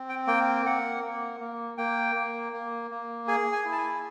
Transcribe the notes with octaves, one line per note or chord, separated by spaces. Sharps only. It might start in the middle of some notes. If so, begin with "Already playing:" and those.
Already playing: C4
G5
A#3 G5
A#3 F#5
A#3
A#3
A#3 G5
A#3
A#3
A#3
G#4 G#5
G#5
E4
A5
G#5